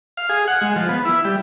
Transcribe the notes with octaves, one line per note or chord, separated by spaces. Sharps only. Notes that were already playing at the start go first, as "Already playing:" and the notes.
F5
G#4
F#5
G#3
F3
B3
E4
G3